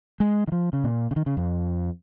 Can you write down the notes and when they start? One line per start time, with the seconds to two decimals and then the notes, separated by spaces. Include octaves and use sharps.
0.20 G#3
0.48 D#3
0.52 F3
0.73 C#3
0.84 A#2
1.11 C#3
1.16 D#3
1.26 C#3
1.37 F2